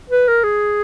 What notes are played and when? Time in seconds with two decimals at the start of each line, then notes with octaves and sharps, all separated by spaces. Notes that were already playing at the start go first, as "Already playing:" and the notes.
0.10 B4
0.27 A#4
0.44 G#4